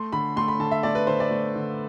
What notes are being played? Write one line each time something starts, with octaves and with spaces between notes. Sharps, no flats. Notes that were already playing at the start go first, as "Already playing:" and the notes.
Already playing: A3 C6
D3 B5
A3 C6
B5
D3 A5
E5
A3 D5
B4
D3 C5
D5
A3
D3